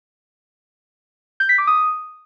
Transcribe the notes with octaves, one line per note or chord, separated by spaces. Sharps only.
G6
B6
D6
D#6